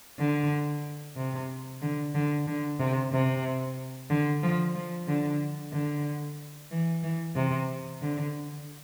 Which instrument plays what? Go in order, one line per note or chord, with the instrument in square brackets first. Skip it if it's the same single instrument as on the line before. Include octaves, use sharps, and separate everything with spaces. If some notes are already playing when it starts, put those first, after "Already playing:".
[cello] D3
C3
D3
D3
D3
C3
C3
D3
F3
F3
D3
D3
E3
E3
C3
D3